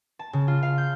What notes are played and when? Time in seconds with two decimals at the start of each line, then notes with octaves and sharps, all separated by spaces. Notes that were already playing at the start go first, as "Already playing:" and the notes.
0.19 A5
0.33 C#3
0.48 F4
0.63 F5
0.78 G6